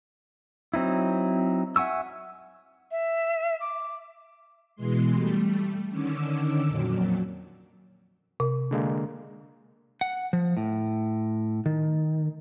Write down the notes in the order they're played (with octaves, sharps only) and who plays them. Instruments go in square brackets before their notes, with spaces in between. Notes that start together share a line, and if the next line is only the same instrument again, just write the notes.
[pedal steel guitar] F#3 C4 D#4 E4
E5 F#5 G#5 C#6 E6
[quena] E5
D6
[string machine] B2 E3 G#3 C6
G3 A3
D3 D#3 C#4 D6 E6
F2 A#2 F#3
[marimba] C3
[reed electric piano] D3 G#3 A#3
[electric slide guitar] F#5
F3
A2
D#3